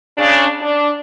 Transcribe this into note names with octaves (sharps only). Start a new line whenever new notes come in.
C#3 D4
D4